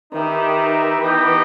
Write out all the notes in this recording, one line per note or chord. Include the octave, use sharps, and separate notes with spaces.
D#3 D#4 G4 B4 E5
E3 B3 D#4 G4 D#5 G5